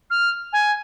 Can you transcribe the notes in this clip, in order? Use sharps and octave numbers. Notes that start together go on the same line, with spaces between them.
F6
G#5